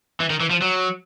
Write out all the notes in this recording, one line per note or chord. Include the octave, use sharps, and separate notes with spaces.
E3
D#3
E3
F3
F#3